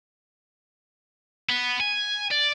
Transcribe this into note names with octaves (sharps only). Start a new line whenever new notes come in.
B3
G#5
D5